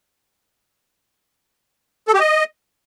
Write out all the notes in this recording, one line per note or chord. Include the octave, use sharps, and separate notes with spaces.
A4
G4
D#5